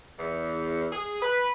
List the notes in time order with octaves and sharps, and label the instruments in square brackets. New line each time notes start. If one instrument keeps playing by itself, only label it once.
[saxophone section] E2
G#4
B4